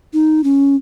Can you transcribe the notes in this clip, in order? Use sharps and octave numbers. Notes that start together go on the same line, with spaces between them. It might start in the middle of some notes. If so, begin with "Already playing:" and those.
D#4
C#4